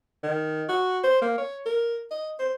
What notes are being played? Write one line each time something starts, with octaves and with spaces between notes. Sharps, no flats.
D#3
F#4
C5
A#3
C#5
A#4
D#5
C5